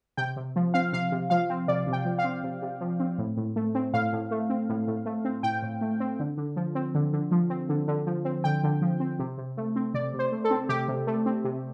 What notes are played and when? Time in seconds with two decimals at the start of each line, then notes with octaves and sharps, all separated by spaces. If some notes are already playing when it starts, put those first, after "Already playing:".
0.17 C3 G5
0.36 C3
0.56 F3
0.74 C4 F5
0.93 C3 F5
1.12 C3
1.30 F3 F5
1.50 C4
1.68 C3 D5
1.87 C3
1.93 G5
2.05 F3
2.19 F5
2.24 C4
2.43 C3
2.62 C3
2.81 F3
3.00 C4
3.18 A2
3.37 A2
3.56 A3
3.75 C4
3.94 A2 F5
4.13 A2
4.31 A3
4.50 C4
4.69 A2
4.87 A2
5.06 A3
5.25 C4
5.43 A2 G5
5.62 A2
5.81 A3
6.00 C4
6.20 D3
6.37 D3
6.56 F3
6.75 C4
6.95 D3
7.13 D3
7.31 F3
7.50 C4
7.69 D3
7.88 D3
8.07 F3
8.25 C4
8.44 D3 G5
8.64 D3
8.82 F3
9.00 C4
9.19 C3
9.38 C3
9.57 A3
9.76 C4
9.94 C3 D5
10.14 C3
10.19 C5
10.32 A3
10.44 A4
10.51 C4
10.69 C3 G4
10.88 C3
11.07 A3
11.26 C4
11.44 C3